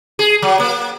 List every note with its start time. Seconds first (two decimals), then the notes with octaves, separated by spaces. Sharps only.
0.19 G#4
0.42 F#3
0.60 A#3